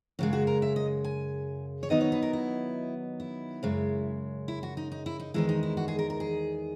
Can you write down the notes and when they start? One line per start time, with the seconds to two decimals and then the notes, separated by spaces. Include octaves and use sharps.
0.19 F#2 C#3 G#3 F#4
0.33 F#4
0.47 A#4
0.62 E5
0.76 D#5
1.04 G#5
1.83 C#5
1.90 D#3 F#3 B3 D#4 D#5
2.01 C#5
2.12 B4
2.22 A#4
2.33 E4
3.20 E4
3.63 F#2 C#3 G#3
4.48 E4
4.63 F#4
4.77 D#4
4.92 D#4
5.06 E4
5.20 D#4
5.34 E2 D#3 G#3 E4
5.49 D#4
5.63 E4
5.77 F#4
5.88 G#4
5.99 A#4
6.10 A#4
6.20 G#4